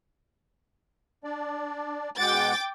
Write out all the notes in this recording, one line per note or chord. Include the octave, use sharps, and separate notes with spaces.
D4 D5
B2 G#3 F#5 G5 D6 A6